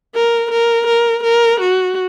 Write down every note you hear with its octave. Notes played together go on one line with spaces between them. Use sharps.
A#4
A#4
A#4
A#4
F#4